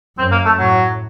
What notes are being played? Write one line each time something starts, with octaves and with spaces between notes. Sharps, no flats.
F#2 C4
A#3
A3
A2 F#3